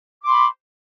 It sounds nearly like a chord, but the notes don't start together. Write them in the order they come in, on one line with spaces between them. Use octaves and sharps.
D6 C6 B5